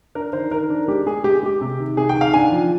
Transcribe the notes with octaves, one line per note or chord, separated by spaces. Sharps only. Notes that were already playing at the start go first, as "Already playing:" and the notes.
D4 A#4
D#3 C5
D#3 A#4
D4
G#3 G4
G#3 G#4
G#3 G4
G#3 G4
C3
D#3
C3 G#4
G5
D#3
F5
D4 G#5
F3